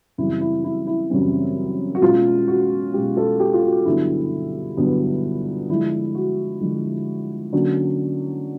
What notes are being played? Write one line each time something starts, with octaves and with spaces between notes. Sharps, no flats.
F#2 C#3 E3 G3 C4 E4
E4
E4
E4
F#2 C#3 E3 G3 C4
F#4
B2 G#3 C#4 F4
F#4
B2 G#3 C#4 G4
A4
G4
F4
F#4
G2 D3 F#3 B3 E4
G2 D3 F#3 B3
D3 F3 G#3 E4
F#4
D3 F3 G#3
D3 F#3 A#3 C#4